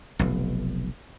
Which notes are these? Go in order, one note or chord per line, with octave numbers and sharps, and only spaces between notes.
F1 B1